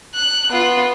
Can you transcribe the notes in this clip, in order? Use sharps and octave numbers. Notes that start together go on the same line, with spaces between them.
F#6
B3 F4